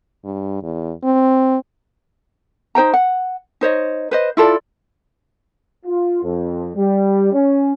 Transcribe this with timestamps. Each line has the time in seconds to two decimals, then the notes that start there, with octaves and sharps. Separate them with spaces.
0.25 G2
0.63 E2
1.04 C4
2.75 D#4 C5 G5 A#5
2.93 F#5
3.61 D#4 C5 C#5 D#5
4.11 B4 C5 D#5
4.37 E4 F4 A4 D5
5.86 F4
6.22 F2
6.76 G3
7.33 C#4